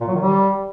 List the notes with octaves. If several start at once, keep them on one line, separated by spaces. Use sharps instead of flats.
A#2
F#3
D#3
G3